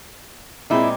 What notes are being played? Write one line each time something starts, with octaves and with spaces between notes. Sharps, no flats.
A#2 G#3 C4 E4